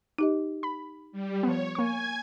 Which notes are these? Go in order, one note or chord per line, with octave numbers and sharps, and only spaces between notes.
D#4 G4 D#5
B5
G3
F3 B3 C#5
A#3 G#5 C#6 G#6